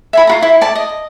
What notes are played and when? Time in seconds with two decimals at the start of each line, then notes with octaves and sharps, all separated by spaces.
0.13 E5 G#5 B5
0.27 F4 F#4 A#5
0.42 E4 E5
0.61 D5 A5
0.75 D#5